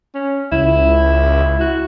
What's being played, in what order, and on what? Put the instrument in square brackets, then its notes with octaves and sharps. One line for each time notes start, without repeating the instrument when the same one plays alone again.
[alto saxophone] C#4
[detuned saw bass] C#2 [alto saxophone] E4
[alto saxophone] F#4